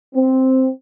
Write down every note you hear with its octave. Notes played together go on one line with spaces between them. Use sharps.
C4